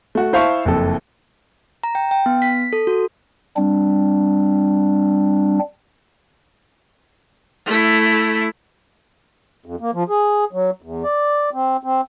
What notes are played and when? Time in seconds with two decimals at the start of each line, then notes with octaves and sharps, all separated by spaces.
0.15 A3 F#4
0.33 E4 C5 E5 F5 A5 C#6
0.65 F#1 F2 A4
1.84 A#5
1.95 G5
2.11 G5
2.26 B3
2.42 B6
2.73 A4
2.87 F#4
3.57 G3 C4 D4
7.66 A3 E4
9.66 F2
9.80 A#3
9.94 F3
10.09 G#4
10.53 F#3
10.82 E2
11.04 D5
11.54 C4
11.83 C4